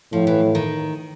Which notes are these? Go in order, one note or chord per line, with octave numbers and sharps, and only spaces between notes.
A2 F3
E3
D#3